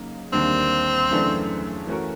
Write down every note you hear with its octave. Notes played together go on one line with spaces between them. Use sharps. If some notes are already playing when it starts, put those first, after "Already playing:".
Already playing: C#3 F#3 A#3 D#4
D#2 D3 G3 A#3 C4 D4
F#2 C#3 E3 A3 D4
E3 A3 C#4 F#4 A#4